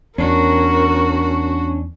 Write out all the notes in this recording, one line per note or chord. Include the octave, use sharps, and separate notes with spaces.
E2 C#4 D4 F#4 A#4